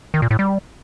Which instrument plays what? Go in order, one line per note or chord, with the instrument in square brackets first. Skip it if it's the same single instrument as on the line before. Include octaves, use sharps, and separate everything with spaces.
[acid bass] D#3
A#2
A2
G3